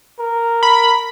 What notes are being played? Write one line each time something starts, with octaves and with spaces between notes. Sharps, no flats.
A#4
B5